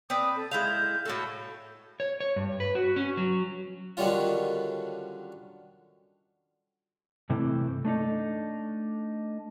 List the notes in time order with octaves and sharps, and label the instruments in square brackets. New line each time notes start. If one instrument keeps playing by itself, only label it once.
[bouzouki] C4 B4 D5 [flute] D#6
[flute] A4
[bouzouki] G#3 E4 F5 [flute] G6
[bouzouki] A2 F#4 A4
[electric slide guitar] C#5
C#5
G2
B4
F#4
C#4
F#3
[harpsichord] D3 D#3 F#3 G3 C#4 F4
[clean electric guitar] G2 C3 E3 A3 C4
A3 D4 D#4 A4